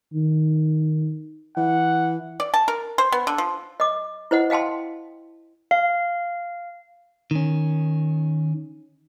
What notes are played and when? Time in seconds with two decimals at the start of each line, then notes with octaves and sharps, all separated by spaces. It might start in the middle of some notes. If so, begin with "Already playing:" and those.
0.13 D#3
1.57 E3 F#5
2.40 D5
2.54 A5
2.68 A#4
2.98 C5
3.12 B3
3.27 D3
3.38 F3
3.80 D#5 D6
4.31 E4 C5 D#5 F#5
4.50 D#5 F5 G5 A5 C6
5.71 F5
7.31 D#3 C#4